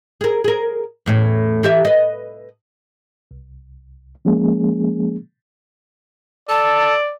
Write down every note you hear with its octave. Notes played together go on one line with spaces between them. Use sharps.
G#4 A#4
G#4 A#4
E2 A2 C#4
E3 G4 E5
B4 D#5
C2
F3 G#3 A#3 C#4 G#4
A4 D5 A5